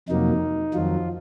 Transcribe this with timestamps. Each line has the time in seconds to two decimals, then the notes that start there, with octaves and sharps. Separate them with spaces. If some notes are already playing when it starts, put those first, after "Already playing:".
0.09 F2 C3 F#3 A#3 D#4
0.74 F2 D#3 F3 F#3 F4